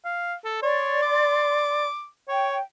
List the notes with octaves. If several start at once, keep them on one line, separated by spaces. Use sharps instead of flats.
F5
A4
C#5 D5 C6
D6
C#5 G5